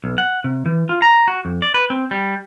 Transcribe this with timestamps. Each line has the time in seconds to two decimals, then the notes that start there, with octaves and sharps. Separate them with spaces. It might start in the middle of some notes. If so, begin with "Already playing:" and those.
0.04 B1
0.18 F#5
0.44 C3
0.66 E3
0.89 F4
1.02 A#5
1.28 F#4
1.45 F2
1.62 D5
1.74 B4
1.90 C4
2.11 G3